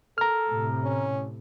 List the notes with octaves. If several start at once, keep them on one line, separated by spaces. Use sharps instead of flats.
A4 A#5 F6
A2 C3
C#4